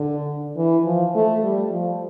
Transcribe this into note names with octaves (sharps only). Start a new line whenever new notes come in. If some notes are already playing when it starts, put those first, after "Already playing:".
Already playing: D3
E3
F3
A3
G3
F3